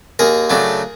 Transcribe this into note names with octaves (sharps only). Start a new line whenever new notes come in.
D#2 G#4 A#4
C#3 F#3 A3 D4